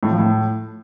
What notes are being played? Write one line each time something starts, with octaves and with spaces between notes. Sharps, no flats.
A2
F3
A2